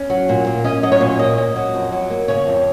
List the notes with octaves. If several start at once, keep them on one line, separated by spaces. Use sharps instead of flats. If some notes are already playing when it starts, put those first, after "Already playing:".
Already playing: C#4
F#3
A#2
A#3
C#4 D#5
F#3 D#5
C#5
A#2
A#3 D#5
C#4
F#3
F2
F#3
A#3
C#3 C#5
F2